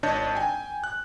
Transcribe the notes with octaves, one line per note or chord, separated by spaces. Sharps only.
G#1 D4 C#5 D#5 A5 G6
G5 G#5
F#6